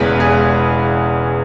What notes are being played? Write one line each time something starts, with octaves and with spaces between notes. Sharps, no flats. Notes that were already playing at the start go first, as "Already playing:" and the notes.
Already playing: E1 E2 C#3 G#3 B3 B4
G#4